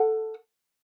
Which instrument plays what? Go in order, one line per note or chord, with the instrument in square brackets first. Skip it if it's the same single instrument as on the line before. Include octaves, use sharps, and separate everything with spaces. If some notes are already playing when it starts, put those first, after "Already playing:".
Already playing: [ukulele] A4 F#5